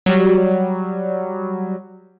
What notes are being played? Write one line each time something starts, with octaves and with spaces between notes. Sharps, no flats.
F#3 G3